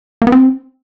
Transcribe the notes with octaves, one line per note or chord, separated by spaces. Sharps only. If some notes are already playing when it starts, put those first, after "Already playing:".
A#3
B3
C4